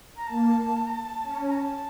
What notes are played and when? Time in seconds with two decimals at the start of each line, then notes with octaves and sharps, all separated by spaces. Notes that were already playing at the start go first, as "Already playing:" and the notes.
0.17 A#5
0.27 A#3 A5
0.87 A#5
0.91 A5
1.23 C#4
1.50 A#5
1.54 A5